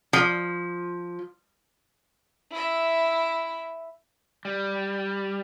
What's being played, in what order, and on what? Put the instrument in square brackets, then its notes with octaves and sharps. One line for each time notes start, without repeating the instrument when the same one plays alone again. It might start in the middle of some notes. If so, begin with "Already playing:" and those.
[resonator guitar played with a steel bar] F3
[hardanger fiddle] E4 E5
[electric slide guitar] G3